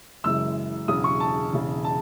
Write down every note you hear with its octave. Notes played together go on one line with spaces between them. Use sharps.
F#1 F#2 E3 G#3 E6
E1 E2 C#3 F#3 D#6
C#6
A5
E1 E2 C#3
A5